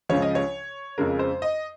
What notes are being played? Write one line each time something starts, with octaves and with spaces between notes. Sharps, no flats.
C#2 C#3 F3 C#5
D#5
C#5
F2 C#3 G#3 A#4
C5
D#5